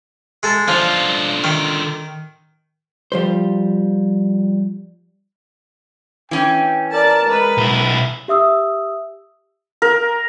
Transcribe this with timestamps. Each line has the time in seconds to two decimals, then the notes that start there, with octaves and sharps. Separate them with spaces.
0.43 G#3 A4
0.68 D3 F3 F4
1.44 D#3
3.12 F3 G3 C5
6.31 E3 C#4 G5
6.92 A#4 D5 A5
7.27 G#3 B4
7.58 B1 E4
8.28 G4 E5 D#6 E6
9.82 A#4